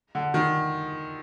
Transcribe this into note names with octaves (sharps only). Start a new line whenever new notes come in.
D3
D#3